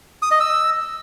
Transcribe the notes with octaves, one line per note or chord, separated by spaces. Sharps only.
D#6
D#5
E6